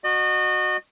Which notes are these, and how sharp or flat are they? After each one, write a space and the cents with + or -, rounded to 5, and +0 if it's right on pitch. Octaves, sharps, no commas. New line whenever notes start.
F#4 -10 D#5 -35